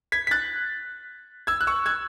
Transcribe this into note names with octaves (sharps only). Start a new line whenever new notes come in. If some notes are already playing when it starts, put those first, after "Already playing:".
G#6 B6
B6
F#6 A6
E6 G#6
F#6
C#6 E6
E6 G#6